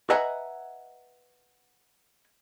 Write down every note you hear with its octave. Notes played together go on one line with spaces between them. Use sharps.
B4 D#5 E5 F#5 G#5 A#5